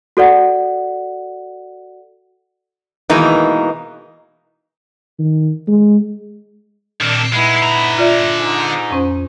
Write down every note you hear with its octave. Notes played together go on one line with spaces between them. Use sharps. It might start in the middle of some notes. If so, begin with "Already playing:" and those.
F#4 A4 D5 F#5
B2 D#3 E3 G#3 A#3 D#4
D#3
G#3
A#2 D#3 C4 D4
G#3 B3 D#4 E4
D3 A#5
F4 D5 E5
G#2 D#4
F2 C#4 C5